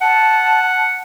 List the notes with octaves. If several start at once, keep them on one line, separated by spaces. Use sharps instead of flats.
F#5 A5